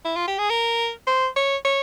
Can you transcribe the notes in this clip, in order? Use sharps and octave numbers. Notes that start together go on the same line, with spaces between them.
E4
F4
G4
G#4
A#4
C5
C#5
C#5